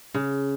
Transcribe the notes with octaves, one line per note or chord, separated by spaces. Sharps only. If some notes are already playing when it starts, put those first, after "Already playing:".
C#3